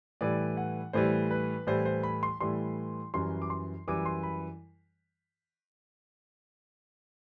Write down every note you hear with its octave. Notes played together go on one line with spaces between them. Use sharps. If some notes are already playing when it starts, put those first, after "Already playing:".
A2 E3 G3 D5
F#5
A2 E3 G3 C5
B4
A2 E3 G3 C5
C5
B5
C6
A2 E3 G3 C6
F#2 E3 G3 C6
D6
C6
F#2 E3 G3 D6
C6
B5